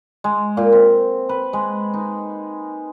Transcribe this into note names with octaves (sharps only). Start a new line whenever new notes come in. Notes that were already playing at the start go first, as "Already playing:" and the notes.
G#3
A#2
C4
B4
G#3
D#4